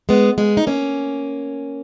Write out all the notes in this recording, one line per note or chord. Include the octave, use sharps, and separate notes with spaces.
G#3 B3
G#3 B3
D#4
A#3 C#4